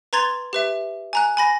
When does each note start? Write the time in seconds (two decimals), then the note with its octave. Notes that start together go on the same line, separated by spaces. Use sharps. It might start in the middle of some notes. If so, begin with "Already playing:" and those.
0.13 B4 A#5 C6 G#6 A6 F7
0.53 G4 B4 E5
1.13 G#5 A#5 F#6
1.37 G#5 B5 A#6